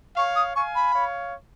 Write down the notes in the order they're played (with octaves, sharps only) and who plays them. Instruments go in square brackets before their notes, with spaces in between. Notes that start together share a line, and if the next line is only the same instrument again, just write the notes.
[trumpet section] C#5 F5 [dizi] C#6
[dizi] D#6
[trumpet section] F5 G#5 [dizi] C#6
[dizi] B5
[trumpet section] C#5 F5